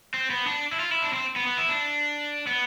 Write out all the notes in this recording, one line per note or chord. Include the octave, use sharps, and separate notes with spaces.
C4
B3
D4
E4
F4
E4
D4
C4
B3
B3
E4
D4
B3